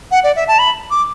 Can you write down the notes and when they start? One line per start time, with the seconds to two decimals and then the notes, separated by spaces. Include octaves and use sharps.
0.11 F#5
0.24 D5
0.36 E5
0.48 A5
0.59 B5
0.91 D6